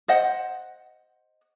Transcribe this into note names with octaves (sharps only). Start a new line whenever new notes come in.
C5 D#5 F#5